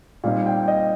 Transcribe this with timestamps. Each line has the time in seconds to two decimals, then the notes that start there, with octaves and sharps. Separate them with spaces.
0.24 A#2 G3 C4 D#4 F5
0.46 G5
0.68 D#5